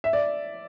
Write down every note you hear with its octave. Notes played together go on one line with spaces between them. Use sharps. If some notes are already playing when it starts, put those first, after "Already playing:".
E5
D5